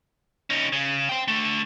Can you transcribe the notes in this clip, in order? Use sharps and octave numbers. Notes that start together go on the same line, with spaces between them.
C#4 D#4
C#3
C5 G5
D3 A3